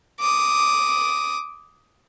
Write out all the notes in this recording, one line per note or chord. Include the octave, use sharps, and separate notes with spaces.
D6 D#6